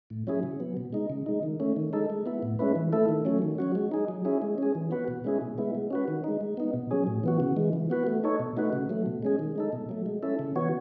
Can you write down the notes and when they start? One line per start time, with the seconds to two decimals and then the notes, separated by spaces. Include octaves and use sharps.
0.10 A2
0.27 F#3 C#4 E4 G#4
0.43 C#3
0.60 F#3 B3
0.77 B2
0.93 G#3 D#4
1.10 C#3
1.26 G#3 D#4
1.43 D#3
1.60 A3 C#4
1.76 D#3
1.93 G#3 D#4 A4
2.10 G#3
2.26 B3 E4
2.42 A2
2.59 G#3 C#4 E4 B4
2.76 E3
2.92 A3 E4 A4
3.09 D#3
3.25 F#3 A3 C#4
3.42 D#3
3.58 F#3 C#4 F#4
3.75 G#3
3.92 D#4 G#4
4.08 F#3
4.25 C#4 E4 G#4
4.42 G#3
4.58 C#4 G#4
4.75 E3
4.91 B3 F#4 B4
5.08 B2
5.24 G#3 C#4 E4 G#4
5.41 B2
5.58 G#3 B3 E4
5.75 G#3
5.91 C#4 F#4 B4
6.08 D#3
6.24 G#3 D#4
6.41 G#3
6.57 B3 D#4
6.74 B2
6.91 F#3 C#4 G#4
7.07 A2
7.24 E3 B3 F#4
7.40 C#3
7.56 E3 G#3
7.73 E3
7.90 B3 F#4 B4
8.07 A3
8.24 D#4 A4 C#5
8.39 B2
8.57 A3 D#4 F#4 B4
8.73 C#3
8.90 F#3 A3
9.06 B2
9.23 G#3 C#4 G#4
9.39 D#3
9.56 G#3 D#4 A4
9.72 B2
9.89 F#3 A3
10.06 G#3
10.23 C#4 E4 A4
10.39 C#3
10.56 E3 B3 F#4 C#5